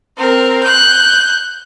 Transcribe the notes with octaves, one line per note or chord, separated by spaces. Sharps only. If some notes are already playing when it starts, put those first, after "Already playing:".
C4 A#4
F#6 G6